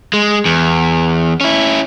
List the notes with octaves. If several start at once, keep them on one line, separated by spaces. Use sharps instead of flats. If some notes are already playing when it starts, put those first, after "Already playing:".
G#3
E2
C#4 E4